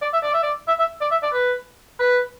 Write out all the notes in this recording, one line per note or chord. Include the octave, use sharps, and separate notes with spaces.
D5
E5
D5
E5
D5
E5
E5
D5
E5
D5
B4
B4